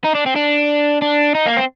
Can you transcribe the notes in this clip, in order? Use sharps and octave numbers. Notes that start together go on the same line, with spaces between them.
D#4
D4
C4
D4
D4
D#4
A#3
C4